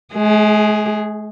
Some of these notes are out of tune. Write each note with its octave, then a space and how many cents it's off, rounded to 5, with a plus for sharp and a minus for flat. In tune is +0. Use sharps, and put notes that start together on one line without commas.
G#3 +45 G#4 +0